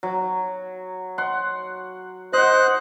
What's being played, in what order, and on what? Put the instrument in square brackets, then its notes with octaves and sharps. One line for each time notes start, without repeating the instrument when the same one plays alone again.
[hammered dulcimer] F#3
F#5 C6
[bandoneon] C5 F#6 [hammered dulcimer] D#5 F#5